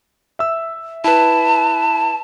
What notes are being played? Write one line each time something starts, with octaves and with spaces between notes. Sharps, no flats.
E5 E6
E4 B4 A5